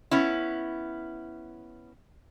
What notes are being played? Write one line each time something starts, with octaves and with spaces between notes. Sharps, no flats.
B3 C#4 E4